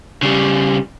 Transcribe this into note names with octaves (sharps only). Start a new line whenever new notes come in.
C#3 G3